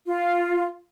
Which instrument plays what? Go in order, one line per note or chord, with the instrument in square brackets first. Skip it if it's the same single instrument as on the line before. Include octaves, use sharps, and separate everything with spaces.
[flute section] F4